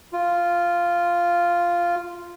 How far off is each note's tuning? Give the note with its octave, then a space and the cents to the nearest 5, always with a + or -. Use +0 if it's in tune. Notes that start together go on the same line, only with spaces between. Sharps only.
F4 -5